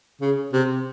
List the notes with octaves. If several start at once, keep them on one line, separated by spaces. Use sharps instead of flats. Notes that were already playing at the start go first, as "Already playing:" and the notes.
C#3
C3